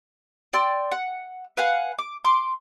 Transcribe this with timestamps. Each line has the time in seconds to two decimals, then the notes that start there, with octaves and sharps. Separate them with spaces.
0.53 D5 G5 C6 E6
0.92 F#5
1.57 B4 F5 F#5 G#5
1.99 D6
2.25 C6 D6